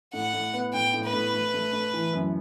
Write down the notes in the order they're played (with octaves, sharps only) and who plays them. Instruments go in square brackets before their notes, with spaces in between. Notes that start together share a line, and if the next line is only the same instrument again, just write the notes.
[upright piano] A2 [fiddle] F#5
[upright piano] A2
B3
[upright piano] A2 [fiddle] G5
[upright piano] A2
[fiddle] B4
[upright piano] A2
A3
A3
A3
E3
F#2